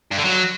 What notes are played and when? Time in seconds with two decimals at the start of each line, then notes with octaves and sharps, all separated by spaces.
0.12 G2
0.18 D3
0.25 F#3